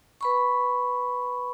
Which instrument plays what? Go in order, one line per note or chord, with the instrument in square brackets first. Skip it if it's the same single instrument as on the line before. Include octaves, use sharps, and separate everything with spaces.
[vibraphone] B4 B5 C#6